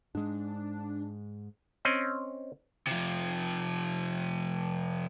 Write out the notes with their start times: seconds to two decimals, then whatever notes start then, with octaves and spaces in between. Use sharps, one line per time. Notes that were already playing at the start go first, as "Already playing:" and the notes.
0.15 G#2 G#3 D4
1.85 C4 C#4 D#5
2.87 C3 F3